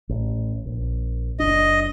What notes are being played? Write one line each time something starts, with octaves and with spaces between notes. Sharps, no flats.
A1
A#1
F#1 D4 D#5